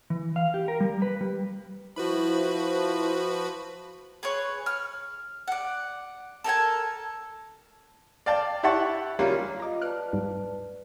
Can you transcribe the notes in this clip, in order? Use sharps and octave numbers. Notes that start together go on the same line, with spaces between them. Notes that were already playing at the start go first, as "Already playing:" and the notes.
E3
F5
G4
A#4
G3
B4
G3
F3 E4 F#4 B4 B5
G#4 B4 C#5
F6
D5 F#5
A4 A#4 G5 G#5
D5 F5 G5 A5
E4 G4 E5 F#5 A5 C#6
F#3 G3 A#3 C#4 F4
F4 D#5 F5 A#5 D6
B4 D5 A5 F6 F#6 D7
G#2 G3